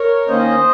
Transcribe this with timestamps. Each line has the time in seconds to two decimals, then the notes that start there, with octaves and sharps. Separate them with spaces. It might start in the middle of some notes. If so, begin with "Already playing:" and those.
Already playing: A#4 C#5
0.28 D#3 A#3 C#4 C5 D#5